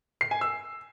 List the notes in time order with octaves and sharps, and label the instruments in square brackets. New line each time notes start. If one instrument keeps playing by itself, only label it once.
[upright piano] C7
G#5
E6